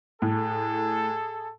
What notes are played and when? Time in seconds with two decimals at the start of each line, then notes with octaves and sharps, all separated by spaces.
0.22 A2 G#4 A4